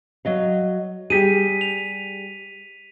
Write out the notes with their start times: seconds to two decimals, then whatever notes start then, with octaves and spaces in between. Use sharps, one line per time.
0.25 F#3 D#5 F5
1.10 G3 G4 G#4 B6 D#7
1.61 F7